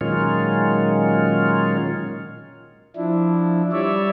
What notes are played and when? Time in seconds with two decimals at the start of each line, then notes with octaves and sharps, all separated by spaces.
0.01 A#2 D#3 F#3 G#3 C#4 F4
2.96 F3 D4 E4
3.72 G3 C#5 D5 E5